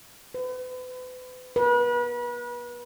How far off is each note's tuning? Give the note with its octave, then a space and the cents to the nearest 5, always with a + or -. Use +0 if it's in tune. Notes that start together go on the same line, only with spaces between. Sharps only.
B4 +40
B4 -35